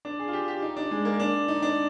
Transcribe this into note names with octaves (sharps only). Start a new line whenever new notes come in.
D4
G#4
F4
G4
G4
D#4
D4
G#3
A#3
D4
D#4
D4